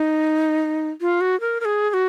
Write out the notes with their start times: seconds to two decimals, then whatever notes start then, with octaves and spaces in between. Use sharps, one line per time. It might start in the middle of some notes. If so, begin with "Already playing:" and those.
Already playing: D#4
1.01 F4
1.21 F#4
1.40 A#4
1.60 A#4
1.65 G#4
1.90 G#4
1.94 F#4